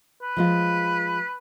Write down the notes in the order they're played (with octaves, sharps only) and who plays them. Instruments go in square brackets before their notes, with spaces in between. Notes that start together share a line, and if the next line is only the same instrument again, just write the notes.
[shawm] B4
[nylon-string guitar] F3 G#3 F4